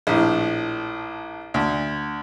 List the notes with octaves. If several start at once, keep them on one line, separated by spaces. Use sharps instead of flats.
A#1 A2
D2